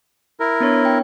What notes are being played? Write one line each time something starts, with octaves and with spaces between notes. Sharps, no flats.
E4 A#4
B3 D4 C#5
G5